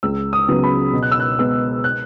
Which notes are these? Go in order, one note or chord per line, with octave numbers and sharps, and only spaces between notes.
C#2 E6
D#6
C#3 F#3 B3
B5
B2
F#6
E6
F#6
G#3 B3 E6
F#6